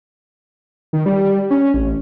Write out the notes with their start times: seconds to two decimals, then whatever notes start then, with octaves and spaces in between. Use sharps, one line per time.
0.93 D#3
1.06 G3
1.50 C#4
1.74 A1